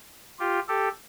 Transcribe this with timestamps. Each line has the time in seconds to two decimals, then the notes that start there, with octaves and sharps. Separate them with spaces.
0.39 F4 G4
0.68 G4 A4